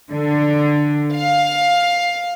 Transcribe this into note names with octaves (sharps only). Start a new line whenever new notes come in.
D3
F5